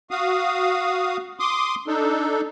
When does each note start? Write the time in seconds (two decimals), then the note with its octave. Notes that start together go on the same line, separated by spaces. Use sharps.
0.11 F#4 F5 D#6
1.40 C6 D6 D#6
1.87 D4 D#4 A4